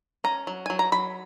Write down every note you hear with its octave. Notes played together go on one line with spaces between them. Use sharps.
C#4 A#5
F#3
F#3 G#5
A#5
F#3 B5